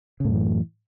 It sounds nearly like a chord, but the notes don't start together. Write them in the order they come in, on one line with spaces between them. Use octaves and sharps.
C#3 A2 F#2 E3